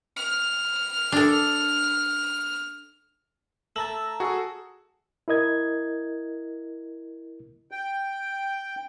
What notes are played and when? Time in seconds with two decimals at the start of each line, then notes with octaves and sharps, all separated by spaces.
0.16 F6
1.12 D4 A4
3.76 A3 A5 A#5 E6 F#7
4.20 F#4 G#4 A4
5.28 E4 A#4 D#5 G#6
7.71 G5